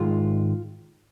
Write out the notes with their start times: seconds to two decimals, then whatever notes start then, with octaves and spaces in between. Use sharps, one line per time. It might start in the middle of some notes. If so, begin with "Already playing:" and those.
Already playing: G#2 D#3 G#3 F4